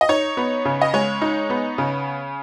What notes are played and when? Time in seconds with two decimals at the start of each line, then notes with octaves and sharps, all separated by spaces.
0.01 D#5
0.09 D#4 C#5
0.37 B3
0.65 C#3
0.82 D#5
0.93 G#3 C#5
1.21 D#4
1.50 B3
1.78 C#3